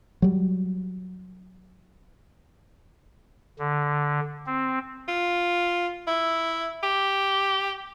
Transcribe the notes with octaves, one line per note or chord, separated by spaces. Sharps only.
F#3 G3
D3
C4
F4
E4
G4